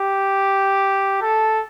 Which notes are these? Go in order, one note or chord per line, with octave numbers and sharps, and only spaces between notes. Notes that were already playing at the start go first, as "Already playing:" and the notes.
Already playing: G4
A4